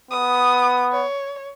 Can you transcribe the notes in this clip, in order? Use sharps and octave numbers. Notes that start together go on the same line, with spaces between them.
B3 D#6
C#5